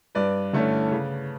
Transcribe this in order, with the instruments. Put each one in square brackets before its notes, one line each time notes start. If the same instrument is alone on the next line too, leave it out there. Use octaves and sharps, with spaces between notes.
[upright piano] G2 B4 D5
D3 A3 C#4
C#3